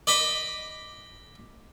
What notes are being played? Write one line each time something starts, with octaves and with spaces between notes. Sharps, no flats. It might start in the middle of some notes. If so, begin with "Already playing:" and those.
D5 D#5 B5 D6